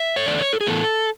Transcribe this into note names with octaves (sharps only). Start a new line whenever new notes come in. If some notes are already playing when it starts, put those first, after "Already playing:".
Already playing: E5
C#5
E2 D3 A3 D5
C#5
A4
G#4
A2 E3 B3 A4